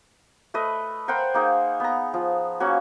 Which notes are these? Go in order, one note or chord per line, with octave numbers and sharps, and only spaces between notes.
A3 B4 D#5
A#4 C5 F#5 G5
A#3 D#4 G#4
B3 A#5
F3
A#3 C#4 F#4